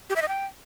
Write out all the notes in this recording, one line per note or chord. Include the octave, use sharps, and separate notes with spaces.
G4
E5
D#5
G5